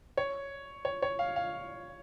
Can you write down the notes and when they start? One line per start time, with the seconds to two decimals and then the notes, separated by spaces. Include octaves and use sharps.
0.17 C#5
0.85 C#5
1.02 C#5
1.19 F5
1.36 F5